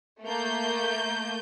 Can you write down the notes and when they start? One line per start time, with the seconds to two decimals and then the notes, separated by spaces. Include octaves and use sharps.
0.23 A3 A#3 G6